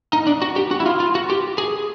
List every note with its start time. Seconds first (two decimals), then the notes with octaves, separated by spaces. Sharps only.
0.13 D#4
0.27 D4
0.42 F#4
0.56 G4
0.71 F#4
0.80 E4
0.86 F4
1.00 F4
1.15 F#4
1.30 G4
1.58 G#4